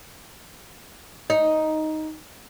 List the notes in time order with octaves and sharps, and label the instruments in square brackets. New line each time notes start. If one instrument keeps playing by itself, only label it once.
[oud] D#4